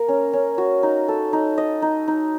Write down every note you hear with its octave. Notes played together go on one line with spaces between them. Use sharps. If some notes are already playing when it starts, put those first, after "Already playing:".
Already playing: A#3 A#4
C#4
C#4
F#4
D#4
A4
D#4
D#5
D#4
D#4